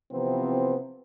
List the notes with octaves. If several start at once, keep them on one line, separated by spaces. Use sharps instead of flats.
C3 E3 F3 B3 C4